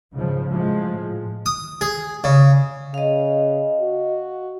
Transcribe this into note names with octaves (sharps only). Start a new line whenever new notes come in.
G#2 C#3 F3
A2 F3 G#3
D#6
G#4
C#3
C#3 D#5 F5
F#4